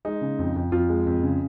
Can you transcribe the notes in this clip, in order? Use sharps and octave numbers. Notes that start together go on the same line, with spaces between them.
G#3 D#4
C#3
F2
F2
F2 F4
G#3
F2
C#3